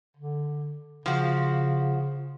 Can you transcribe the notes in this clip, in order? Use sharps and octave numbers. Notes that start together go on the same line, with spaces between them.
D3
C#3 F3 F#4